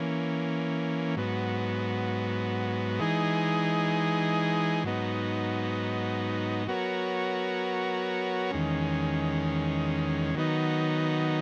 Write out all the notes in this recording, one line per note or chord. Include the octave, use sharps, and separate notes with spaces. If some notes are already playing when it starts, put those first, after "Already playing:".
Already playing: E3 A#3 C#4
G#2 F#3 B3
E3 G#3 D#4 G#4
G#2 F#3 B3 D#4
F#3 B3 F#4 A#4 C#5
E2 D#3 G#3 C#4
D#3 F#3 B3 D#4